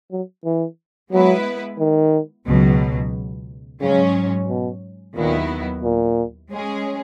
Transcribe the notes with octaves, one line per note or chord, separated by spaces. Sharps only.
F#3
E3
F#3 G#3 B3 E4 B4
D#3
C#2 B2 F#3
G#2 C#3 F#3 C#4
B2
D#2 A#2 D#3 F#3 B3 E4
A#2
G#3 C#4 G#4